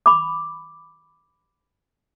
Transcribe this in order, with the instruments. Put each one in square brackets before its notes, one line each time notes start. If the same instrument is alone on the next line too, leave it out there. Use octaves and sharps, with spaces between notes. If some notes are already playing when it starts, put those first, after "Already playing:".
[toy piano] B5 D6